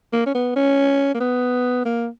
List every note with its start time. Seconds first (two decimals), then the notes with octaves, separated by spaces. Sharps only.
0.13 A#3
0.26 C#4
0.34 B3
0.56 C#4
1.15 A#3
1.20 B3
1.85 A#3